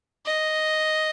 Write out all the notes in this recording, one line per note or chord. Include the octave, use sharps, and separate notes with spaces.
D#5